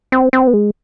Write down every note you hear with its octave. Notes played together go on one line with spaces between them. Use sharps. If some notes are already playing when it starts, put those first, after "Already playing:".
C4
C4
B3
G#3